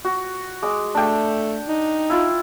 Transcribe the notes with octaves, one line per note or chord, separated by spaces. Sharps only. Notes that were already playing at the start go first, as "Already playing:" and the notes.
F#4
G#3 D6
A3 D4 G5
D#4
E4 F4